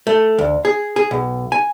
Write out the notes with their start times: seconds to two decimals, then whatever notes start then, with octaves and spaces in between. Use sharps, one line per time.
0.07 A3
0.38 D2
0.65 G#4
0.96 G#4
1.11 B1
1.52 G#5